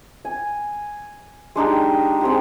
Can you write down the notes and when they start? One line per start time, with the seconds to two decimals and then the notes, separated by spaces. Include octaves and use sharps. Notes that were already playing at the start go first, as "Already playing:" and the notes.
0.25 G#5
1.55 G#3 D4 D#4 G4
2.21 G#3 C4 G4